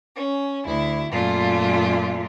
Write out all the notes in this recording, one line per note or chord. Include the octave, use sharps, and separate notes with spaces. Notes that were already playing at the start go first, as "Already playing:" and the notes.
C#4
D2 E4
F#2 A#2 A3 F4